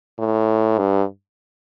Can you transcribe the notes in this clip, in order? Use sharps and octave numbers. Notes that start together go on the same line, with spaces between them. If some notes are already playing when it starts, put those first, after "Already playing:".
A2
G2